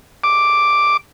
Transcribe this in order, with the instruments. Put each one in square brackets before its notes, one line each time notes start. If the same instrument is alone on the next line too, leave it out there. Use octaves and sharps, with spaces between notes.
[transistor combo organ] D6